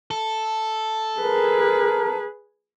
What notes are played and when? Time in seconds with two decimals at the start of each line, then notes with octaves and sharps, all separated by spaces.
0.11 A4
1.20 G#4 A#4 B4